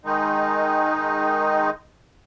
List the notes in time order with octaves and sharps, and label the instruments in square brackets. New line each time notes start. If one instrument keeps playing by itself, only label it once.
[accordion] D#3 G#3 D#4